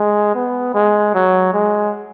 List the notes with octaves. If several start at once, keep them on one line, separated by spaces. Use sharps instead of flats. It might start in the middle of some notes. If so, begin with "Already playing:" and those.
Already playing: G#3
B3
G#3
F#3
G#3